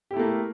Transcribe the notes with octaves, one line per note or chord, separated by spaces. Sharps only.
A3 A#3 E4 G4